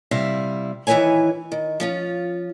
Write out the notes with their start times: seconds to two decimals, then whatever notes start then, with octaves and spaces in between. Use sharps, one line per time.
0.11 C3 G3 E4 E5 F5
0.87 D#3 E3 E4 B4 C#5 G#5
1.52 D#3
1.80 F3 C#4 F4